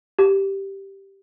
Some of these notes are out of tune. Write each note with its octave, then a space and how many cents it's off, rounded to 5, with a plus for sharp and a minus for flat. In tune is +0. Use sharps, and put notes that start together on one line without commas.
G4 -5